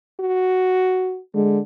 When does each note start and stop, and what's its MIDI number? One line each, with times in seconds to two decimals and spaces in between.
0.20 1.19 66
1.35 1.60 50
1.35 1.59 56